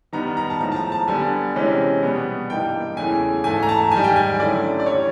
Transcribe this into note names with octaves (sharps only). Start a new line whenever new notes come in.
D#3 G3 B3 A#5
A#5
A5
A2 F3 G#3 A#5
A5
A#5
A5
D3 G3 B3 G#5
C3 E3 G#3 C#4
B2 G3 B3
G2 E3 G3 A#3 D#4 G5
E2 C#3 E3 A3 G#5
G#2 E3 A3 G#5
A#5
A5
G#2 D#3 G3 G#5
G5
G#5
D3 F#3 A3 C#4 E4 D5
D5
E3 G3 C#5